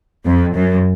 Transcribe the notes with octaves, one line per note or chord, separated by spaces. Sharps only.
F2
F#2